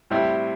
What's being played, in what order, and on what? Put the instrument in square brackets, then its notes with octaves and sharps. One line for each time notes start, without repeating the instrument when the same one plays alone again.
[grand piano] A2 G3 C4 E4